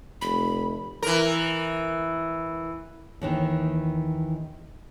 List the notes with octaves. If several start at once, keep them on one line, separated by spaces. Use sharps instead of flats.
F1 B5
E3 A#4
D#2 D#3 E3